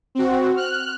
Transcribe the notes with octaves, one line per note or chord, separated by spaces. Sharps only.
C4 F#4
F6 F#6